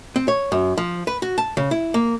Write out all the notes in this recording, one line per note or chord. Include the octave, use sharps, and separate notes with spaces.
C4
C#5
F#2
F3
B4
F#4
A5
C#3
E4
A#3